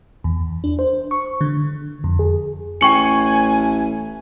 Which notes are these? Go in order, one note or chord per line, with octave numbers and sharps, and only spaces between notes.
E2
D4
C5
C#6
D3
F2
G#4
A1 G5 G#5 C#6 C#7